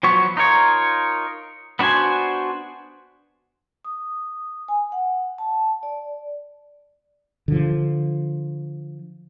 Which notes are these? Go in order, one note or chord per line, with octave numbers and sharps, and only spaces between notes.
F3 F#3 B3 C#6
D#4 F4 A#4 C#5
B3 D4 F#4 C5 G#5
D#6
G#5
F#5
A5
D5
D3 F3